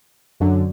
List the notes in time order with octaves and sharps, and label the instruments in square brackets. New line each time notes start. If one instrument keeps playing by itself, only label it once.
[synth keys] F#2 D3 F#3